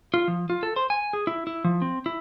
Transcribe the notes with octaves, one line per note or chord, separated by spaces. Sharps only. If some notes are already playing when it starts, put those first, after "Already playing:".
F4
F3
F4
A4
C5
G#5
G#4
E4
E4
F3
C4
E4